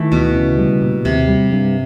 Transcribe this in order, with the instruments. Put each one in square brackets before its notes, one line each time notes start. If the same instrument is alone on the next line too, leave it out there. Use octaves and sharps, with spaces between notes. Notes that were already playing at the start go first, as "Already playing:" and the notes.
Already playing: [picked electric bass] D#3 [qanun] E3 A3
[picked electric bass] D2 [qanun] B2
[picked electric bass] C#3
G3
A#2
[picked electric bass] D#2 [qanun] C3
[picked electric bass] G3
G2